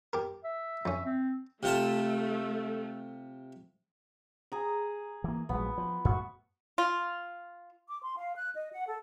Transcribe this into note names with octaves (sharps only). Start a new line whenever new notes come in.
G4 A#4
E5
F2 C#4
C4
C3 A3 F4 A5
G#4 A#5
E3 A#3
A#1 F#3 G#3 B3
F3
F#2 A2 F#4
F4
D6
C6
F5
F#6
D#5
F#5
A4